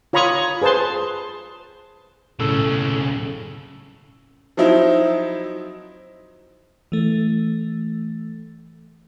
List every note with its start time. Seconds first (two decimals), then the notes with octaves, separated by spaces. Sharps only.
0.13 F4 C#5 A#5 B5 C#6 D#6
0.62 G#4 B4 C5 A5 C6
2.39 B1 A2 C#3 A4 E6
4.57 F3 F#3 C4 D#4 E4
6.92 E3 A3